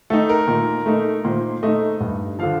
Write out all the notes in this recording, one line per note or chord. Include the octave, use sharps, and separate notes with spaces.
A3 D#4 A4
A#4
A#2
A3 D#4
A#2 C5
A3 D#4 D#5
G2
D3 F3 F5